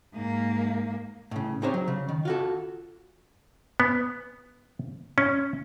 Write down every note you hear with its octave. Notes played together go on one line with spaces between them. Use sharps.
G#2 A#3
A2 C#3
C4 D#4 G4 G#4 C5 C#5
F#3
C#3
D#3
F4 F#4 A4
B3
C#4